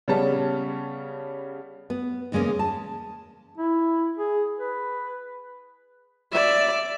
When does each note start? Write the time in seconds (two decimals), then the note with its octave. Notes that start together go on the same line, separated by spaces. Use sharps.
0.08 C#3 G3 B3 C#4 A5
1.90 B3
2.32 E2 C#3 G#3 A#3 C#4
2.59 A5
3.58 E4
4.18 G#4
4.59 B4
6.32 D5 E5